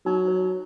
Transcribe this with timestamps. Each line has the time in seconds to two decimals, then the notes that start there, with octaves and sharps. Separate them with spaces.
0.05 F#3 D#4
0.28 C#5